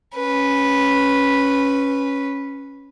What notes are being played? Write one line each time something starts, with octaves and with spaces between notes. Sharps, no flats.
C#4 B4